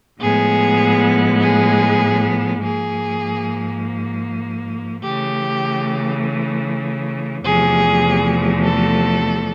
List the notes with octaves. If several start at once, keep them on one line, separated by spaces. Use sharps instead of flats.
A2 F3 G#3 B3 G#4
G#4
G#2 F3 A#3 G#4
C#3 E3 A3 G4
E2 C3 F3 A3 G#4
A4